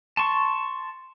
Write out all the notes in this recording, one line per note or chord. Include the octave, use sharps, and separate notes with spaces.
A5 C6 C#6